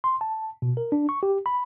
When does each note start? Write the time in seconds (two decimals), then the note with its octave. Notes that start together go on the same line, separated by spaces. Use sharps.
0.04 C6
0.21 A5
0.62 B2
0.77 A#4
0.92 D4
1.09 C#6
1.23 G4
1.46 B5